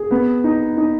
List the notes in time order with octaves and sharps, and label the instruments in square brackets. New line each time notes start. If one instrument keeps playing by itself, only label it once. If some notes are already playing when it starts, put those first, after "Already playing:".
Already playing: [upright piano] G#4
B3
D#4
D#4